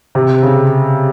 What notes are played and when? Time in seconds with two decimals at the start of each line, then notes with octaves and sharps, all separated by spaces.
0.15 C3
0.43 C#3